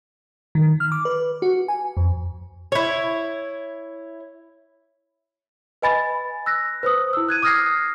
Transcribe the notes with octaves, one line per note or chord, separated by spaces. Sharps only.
D#3
F6
D6
B4
F#4
G#5
F2
E4 C#5
B4 D#5 G#5 B5 A6
E6 F#6 A#6
B4 C5 D#6
E4 E6
F#6 G#6 D#7
D6 D#6 F6 G#6 A#6 C7